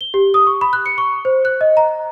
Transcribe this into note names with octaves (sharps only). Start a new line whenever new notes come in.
G7
G4
D#6
C#6
B5
F#6
C#7
C#6
C5
F#6
D#5
A#5